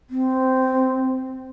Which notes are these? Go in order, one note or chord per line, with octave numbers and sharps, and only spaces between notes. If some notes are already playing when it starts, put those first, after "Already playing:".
C4